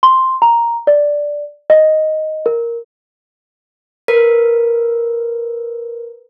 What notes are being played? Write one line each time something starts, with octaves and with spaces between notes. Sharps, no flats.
C6
A#5
D5
D#5
A#4
A#4 B4